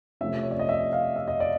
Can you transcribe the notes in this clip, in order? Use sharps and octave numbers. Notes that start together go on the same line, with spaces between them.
C3 F3 A3 C#4 E5
C#5
D5
D#5
E5
F5
E5
D#5
D5